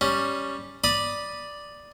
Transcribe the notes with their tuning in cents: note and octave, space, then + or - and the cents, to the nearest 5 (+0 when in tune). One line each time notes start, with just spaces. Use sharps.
G3 +0 C#4 +0
D5 +0 B5 -15 D#6 +0